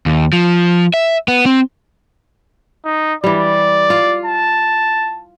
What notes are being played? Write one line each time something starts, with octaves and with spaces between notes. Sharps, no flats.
D#2
F3
E5
B3
C4
D#4
E3 G3 D5
F4
A5